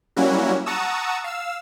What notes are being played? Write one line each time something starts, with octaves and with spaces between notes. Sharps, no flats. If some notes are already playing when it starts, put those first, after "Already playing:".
F#3 G3 A#3 C#4 E4 F#4
F#5 A5 A#5 C#6 D#6 E6
F5 E6